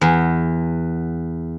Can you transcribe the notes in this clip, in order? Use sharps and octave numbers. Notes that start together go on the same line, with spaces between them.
E2